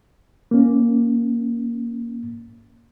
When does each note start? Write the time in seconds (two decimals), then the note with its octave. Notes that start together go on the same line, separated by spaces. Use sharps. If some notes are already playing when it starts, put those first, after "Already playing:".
0.51 A#3 C#4